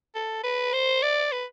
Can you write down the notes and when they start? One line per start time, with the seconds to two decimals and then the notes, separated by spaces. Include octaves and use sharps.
0.15 A4
0.44 B4
0.73 C5
1.03 D5
1.32 B4